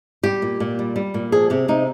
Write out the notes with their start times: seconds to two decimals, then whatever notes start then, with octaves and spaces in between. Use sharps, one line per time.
0.23 G3 G4
0.42 A#2
0.60 A#2
0.79 G3
0.96 G3
1.14 A#2
1.32 F3 G#4
1.50 C3 G4
1.68 C3 D#4